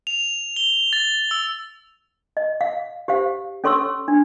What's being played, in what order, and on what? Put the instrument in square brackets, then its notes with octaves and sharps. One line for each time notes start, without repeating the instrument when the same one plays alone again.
[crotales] F7
G7
A6
E6
[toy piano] D#5
F5
G4 C5 F5
C#4 A4 C#5 C6 C#6 E6
D4